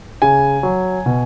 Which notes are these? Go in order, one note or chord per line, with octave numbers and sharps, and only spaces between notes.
C#3 G#5
F#3
B2